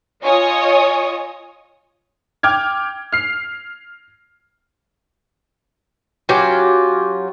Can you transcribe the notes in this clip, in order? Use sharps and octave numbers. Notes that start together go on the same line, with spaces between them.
F4 C#5 D#5 G#5 C#6 D#6
G5 D6 F6 G#6
F6 C7
F#3 C#4 F4 G4